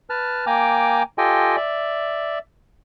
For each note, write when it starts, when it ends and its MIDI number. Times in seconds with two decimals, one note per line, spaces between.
0.10 0.45 71
0.10 0.45 81
0.10 0.45 89
0.47 1.03 58
0.47 1.03 79
0.47 1.03 80
0.47 1.03 82
0.47 1.03 86
1.18 1.56 65
1.18 1.56 67
1.18 1.56 69
1.18 1.56 75
1.18 1.56 79
1.18 1.56 80
1.56 2.39 74
1.56 2.39 76